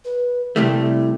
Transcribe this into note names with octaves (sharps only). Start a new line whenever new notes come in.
B4
C3 G3 A3 E4